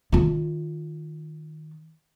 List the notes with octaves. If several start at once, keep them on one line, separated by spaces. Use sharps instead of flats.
D#3 F4